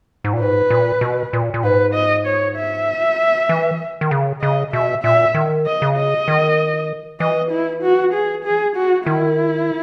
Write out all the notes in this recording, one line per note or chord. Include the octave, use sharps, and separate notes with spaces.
G#2
A#2
G#2 B4
A#2
B2
A#2
A#2
G#2 B4
D#5
C#5
E5
E3
D#3
C#3
C#3 D#5
B2 E5
A#2 E5
D#3
D#5
C#3
D#5
D#3
E3 D#5
E4
F#4
G#4
G#4
F#4
D#3 E4